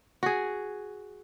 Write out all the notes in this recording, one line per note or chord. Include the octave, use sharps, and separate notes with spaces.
F#4 G#4